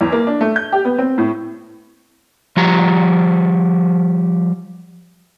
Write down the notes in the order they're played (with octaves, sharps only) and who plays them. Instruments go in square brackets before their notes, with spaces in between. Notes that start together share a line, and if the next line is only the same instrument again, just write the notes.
[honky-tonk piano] E2
A#3
D4
A3
G6
G4
B3
C4
A2
[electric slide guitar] F3 G3 A#5